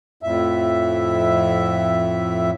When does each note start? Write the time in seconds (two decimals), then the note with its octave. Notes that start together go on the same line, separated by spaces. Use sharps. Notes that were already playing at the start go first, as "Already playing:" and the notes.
0.23 F2 A2 E5